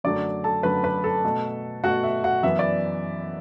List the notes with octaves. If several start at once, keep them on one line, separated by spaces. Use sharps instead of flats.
F#2 D3 F#3 A3 D5 D6
A4 A5
F#2 D3 F#3 A3 B4 B5
B4 B5
A4 A5
B2 A3
B2 A3 F#4 F#5
E5
F#4 F#5
F#2 E3 B3 E5
D5